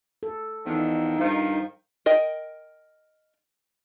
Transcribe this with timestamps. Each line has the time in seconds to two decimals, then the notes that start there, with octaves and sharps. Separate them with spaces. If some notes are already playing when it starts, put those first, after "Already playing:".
0.23 A4
0.66 E2 D3 D#3 F3 D#4
1.19 G2 D#3 F3
2.06 A#4 D#5 G5